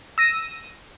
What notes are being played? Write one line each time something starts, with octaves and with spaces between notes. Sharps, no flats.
E6 A#6 D#7